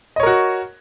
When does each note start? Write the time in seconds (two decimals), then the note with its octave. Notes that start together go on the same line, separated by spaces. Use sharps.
0.16 D#5
0.20 C#5
0.23 A#4
0.27 F#4